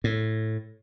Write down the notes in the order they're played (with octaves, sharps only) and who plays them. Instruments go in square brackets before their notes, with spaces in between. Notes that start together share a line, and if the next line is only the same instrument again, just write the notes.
[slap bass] A2